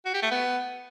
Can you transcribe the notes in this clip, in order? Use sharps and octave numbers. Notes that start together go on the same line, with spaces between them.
F#4
G4
A3
B3